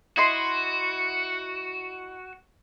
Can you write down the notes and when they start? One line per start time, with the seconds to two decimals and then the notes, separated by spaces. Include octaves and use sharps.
0.17 E4 F#4 D#5 C6